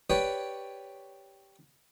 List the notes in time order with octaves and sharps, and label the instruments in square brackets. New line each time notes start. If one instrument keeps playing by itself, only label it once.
[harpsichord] G4 B4 C#5 D5